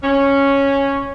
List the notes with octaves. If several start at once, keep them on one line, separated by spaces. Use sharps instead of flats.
C#4